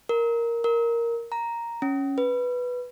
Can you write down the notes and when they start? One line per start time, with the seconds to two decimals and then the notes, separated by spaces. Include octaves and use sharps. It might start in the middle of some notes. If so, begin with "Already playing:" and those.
0.09 A#4
0.64 A#4
1.32 A#5
1.82 C#4
2.18 B4